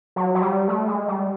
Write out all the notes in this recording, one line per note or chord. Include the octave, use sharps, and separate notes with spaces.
F#3
F#3
G3
A3
G#3
G3